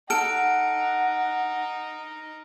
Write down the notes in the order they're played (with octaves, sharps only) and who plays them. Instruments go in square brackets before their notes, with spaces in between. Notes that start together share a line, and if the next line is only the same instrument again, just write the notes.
[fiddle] D#4 [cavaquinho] A4 [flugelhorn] F#5 [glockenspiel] F6 D7